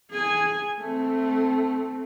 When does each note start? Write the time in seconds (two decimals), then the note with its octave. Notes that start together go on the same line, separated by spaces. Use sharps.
0.11 G#4 G#5
0.79 A3 C4